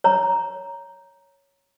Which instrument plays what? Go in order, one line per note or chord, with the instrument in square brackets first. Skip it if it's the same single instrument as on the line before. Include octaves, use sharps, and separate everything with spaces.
[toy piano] C#5 A#5